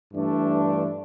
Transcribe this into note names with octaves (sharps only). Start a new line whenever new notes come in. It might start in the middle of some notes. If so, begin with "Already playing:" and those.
G2 E3 A3 D4